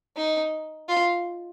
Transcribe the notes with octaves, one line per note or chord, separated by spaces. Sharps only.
D#4
F4